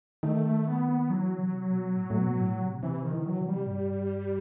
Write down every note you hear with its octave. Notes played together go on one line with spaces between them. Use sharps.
D#3 A3
A3
B3
B3
E3 F#3
C3
B2
A2
A2
B2
A2
C3
C3 E3
D#3
E3
F#3
C3
G3
A2
G2